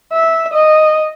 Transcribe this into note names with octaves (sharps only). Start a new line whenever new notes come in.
E5
D#5